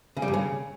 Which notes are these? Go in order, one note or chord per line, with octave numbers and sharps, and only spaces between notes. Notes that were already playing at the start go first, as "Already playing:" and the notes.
C#3
G3
G2
C#3